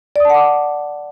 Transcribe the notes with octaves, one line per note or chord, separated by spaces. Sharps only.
D5 F#5 A5 D6 D#6